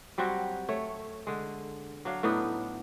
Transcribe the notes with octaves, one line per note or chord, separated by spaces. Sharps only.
F#3 G3 C4 F#4
A3 C#5
D3 G#3
F#3 D4 F5
A2 B3 D4 D#4